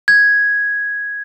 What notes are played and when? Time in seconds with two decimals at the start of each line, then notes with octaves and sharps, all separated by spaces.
0.08 G#6